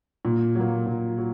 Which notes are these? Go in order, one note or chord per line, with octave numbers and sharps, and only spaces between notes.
A#2
F#3 A#3
A#2
F#3